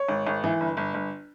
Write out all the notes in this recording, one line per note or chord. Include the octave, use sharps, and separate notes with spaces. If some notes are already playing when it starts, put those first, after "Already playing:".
Already playing: C#5
G#1
G#1
E3
G1
G1
G1